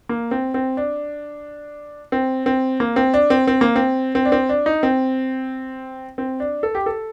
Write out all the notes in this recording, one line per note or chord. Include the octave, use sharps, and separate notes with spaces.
A#3
C4
C4
D4
C4
C4
A#3
C4
D4
C4
C4
A#3
C4
C4
D4
C4
D4
D#4
C4
C4
D4
A4
G4
A4